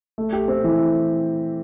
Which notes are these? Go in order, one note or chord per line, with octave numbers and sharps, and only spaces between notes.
A3
G4
C4
E3